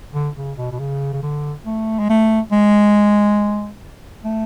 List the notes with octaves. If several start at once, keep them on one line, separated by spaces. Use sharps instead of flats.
D3
C#3
B2
B2
C#3
C#3
D3
A3
G#3
A3
G#3
A3